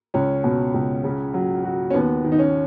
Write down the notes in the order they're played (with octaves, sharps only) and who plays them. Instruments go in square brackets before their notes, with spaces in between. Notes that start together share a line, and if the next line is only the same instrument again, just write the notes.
[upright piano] C#2 [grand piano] C#4
[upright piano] B2
C#2
C#3
F#3
F#4
[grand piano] C#4
[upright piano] D#2 [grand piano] B3
[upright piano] D#3
[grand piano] D#4
C#4